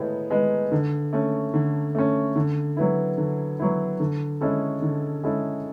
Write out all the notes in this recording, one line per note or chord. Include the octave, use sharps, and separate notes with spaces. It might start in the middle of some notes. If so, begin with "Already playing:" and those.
Already playing: A2 G#3 B3
G#3 B3
D3
A3 C#4
D3
A3 C#4
D3
F#3 B3 E4
D3
F#3 B3 E4
D3
G#3 C#4 E4 A4
D3
G#3 C#4 E4 A4